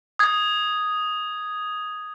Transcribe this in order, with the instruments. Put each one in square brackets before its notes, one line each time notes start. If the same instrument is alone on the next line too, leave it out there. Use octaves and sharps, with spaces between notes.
[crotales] D#6 G#6